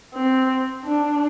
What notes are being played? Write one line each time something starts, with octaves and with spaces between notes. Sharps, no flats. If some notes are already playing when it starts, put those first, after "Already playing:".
C4
D4